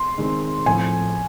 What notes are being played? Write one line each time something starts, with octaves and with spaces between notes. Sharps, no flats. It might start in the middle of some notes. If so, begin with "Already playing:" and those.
Already playing: C6
D#3 G#3 C4
A2 F3 A3 C4 G#5